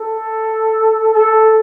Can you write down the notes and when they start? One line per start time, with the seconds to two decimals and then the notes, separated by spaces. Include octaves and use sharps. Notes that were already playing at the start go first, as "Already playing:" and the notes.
Already playing: A4
1.14 A4